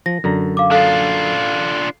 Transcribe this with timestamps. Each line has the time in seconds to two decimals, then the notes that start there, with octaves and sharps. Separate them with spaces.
0.06 F3 A#6
0.24 F#2 D3 A#5
0.57 F5 D6
0.71 D4 F4 A4 F5